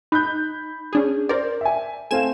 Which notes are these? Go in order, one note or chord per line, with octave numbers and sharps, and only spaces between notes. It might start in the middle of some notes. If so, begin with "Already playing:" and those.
D#4 B5 F#6 G6
C#4 D4 G#4
A#4 C5 D5
E5 G#5
A3 C4 F5 G#5 E7